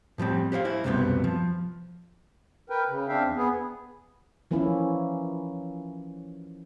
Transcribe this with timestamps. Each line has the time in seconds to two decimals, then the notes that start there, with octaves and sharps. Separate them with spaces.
0.18 A2 F3 G3 C4
0.52 G4 C5 C#5 F5
0.65 E4 C5
0.84 C2 F#2 B2 G3 B3 C4
1.24 F3
2.70 A#4 B4 G5
2.89 C#3
3.08 C4 D4 E5 F5 G5
3.24 E2
3.36 B3 G#4
4.51 E3 F3 A#3 C#4 E4